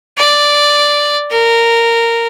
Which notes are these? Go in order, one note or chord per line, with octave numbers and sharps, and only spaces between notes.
D5
A#4